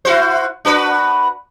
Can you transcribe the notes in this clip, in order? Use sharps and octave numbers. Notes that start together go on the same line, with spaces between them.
E4 F#4 C5
D4 F#4 B4